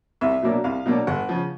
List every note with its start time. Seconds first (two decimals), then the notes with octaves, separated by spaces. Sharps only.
0.21 C2 E5
0.42 B2 F#3 A#3 D4
0.64 C2 F5
0.86 B2 F#3 A#3 D4
1.07 G1 F#5
1.29 C#3 F3